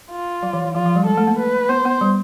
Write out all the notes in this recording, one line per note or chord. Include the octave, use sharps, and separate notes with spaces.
F4
F#3
E3
E3
F3 F4
F3
G3
G#3 A4
A3
A#3
B4
B3 C5
B3
G3